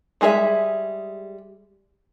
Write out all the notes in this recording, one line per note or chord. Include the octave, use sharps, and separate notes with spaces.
G3 G#3 G#4 A#4 E5